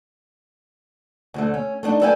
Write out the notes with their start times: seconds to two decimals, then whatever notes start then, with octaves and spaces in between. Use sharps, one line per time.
1.34 D2 D3 A3
1.54 C#4
1.83 A3 B3 D4 D#4
2.01 A4 B4 D5 E5 G5 G#5